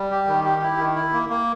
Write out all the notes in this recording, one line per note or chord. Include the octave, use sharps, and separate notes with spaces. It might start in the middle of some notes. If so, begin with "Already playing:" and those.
Already playing: G3
G4
D#3
G4
E4
D#3
E4
A#3
A#3